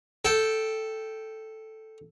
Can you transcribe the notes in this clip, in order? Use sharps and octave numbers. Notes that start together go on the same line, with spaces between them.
A4 G5